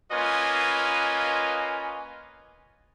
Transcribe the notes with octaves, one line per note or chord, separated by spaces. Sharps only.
A#3 C#4 F4 B4 D#5 G#5